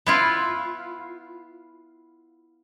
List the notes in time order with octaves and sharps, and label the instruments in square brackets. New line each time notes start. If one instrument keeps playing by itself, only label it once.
[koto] B3 E4 F4